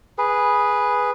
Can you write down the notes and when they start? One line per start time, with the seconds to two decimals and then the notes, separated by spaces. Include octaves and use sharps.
0.18 G#4 B4